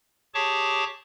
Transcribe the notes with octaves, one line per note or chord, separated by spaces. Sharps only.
G4 G#4 C#5 A5 C#6 D6